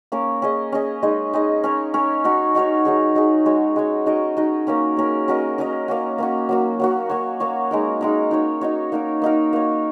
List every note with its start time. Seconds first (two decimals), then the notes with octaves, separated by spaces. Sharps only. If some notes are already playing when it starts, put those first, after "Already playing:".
0.12 A#3 C#4 A#4
0.42 C#4 G#4 D#5
0.72 C#4 G#4 D#5
1.03 G#3 D#4 G#4 D#5
1.33 G#3 D#4 G#4 D#5
1.64 C#4 A#4 C#5
1.94 C#4 A#4 C#5
2.24 D#4 F#4 A#4 C#5
2.55 D#4 F#4 A#4 C#5
2.85 F#3 D#4 G#4
3.15 F#3 D#4 G#4
3.46 G#3 F#4 C#5
3.76 G#3 F#4 C#5
4.06 D#4 F#4 A#4 D#5
4.37 D#4 F#4 A#4 D#5
4.67 A#3 C#4 A#4
4.97 A#3 C#4 A#4
5.28 C#4 F#4 A#4 D#5
5.58 C#4 F#4 A#4 D#5
5.88 A#3 C#4 F#4
6.18 A#3 C#4 F#4
6.49 F#3 A#3 F#4
6.80 F#3 A#3 F#4
7.09 A#3 F#4 C#5
7.40 A#3 F#4 C#5
7.71 G#3 D#4 A#4
8.01 G#3 D#4 A#4
8.31 D#4 F#4 C#5
8.61 D#4 F#4 C#5
8.92 A#3 D#4 F#4 A#4
9.22 A#3 D#4 F#4 A#4
9.53 A#3 F#4 C#5